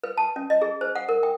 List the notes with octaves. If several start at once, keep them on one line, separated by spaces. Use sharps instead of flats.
B4
A5
C#4
D#5
G#4
C5
F#5
A#4
G5